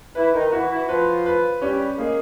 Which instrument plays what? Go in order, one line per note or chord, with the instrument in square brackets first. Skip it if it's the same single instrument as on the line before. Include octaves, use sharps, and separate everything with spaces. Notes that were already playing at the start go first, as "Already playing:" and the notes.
[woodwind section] E3 E4 [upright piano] B4
[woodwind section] D#3 D#4
[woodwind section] E3 E4 [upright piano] F#4
[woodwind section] E3 E4
[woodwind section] F3 F4 [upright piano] B4
[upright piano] B4
[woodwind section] G3 G4 [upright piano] C#4
[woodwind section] G#3 G#4 [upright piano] A#3